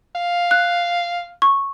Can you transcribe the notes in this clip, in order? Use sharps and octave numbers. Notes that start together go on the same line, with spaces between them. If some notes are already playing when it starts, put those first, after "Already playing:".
F5
F#6
C#6